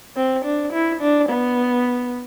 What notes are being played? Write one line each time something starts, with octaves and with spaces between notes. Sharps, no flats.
C4
D4
E4
D4
B3